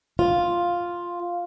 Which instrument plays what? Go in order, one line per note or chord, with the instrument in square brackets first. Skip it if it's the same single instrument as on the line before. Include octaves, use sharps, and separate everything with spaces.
[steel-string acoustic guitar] F4